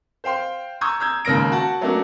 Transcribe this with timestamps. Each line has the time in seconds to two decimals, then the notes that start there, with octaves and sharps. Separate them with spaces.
0.24 C5 F5 G5 C6
0.81 A#5 C#6 D#6 E6 G6 G#6
1.00 A#5 E6 G6 G#6
1.25 D#2 G#2 C#3 A#4 A#6 D7
1.52 F#4 F#5 A5
1.81 F#3 A3 A#3 C#4 D4 F#4